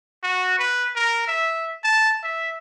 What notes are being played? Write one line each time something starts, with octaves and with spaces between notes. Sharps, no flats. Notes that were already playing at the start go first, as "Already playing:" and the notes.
F#4
B4
A#4
E5
A5
E5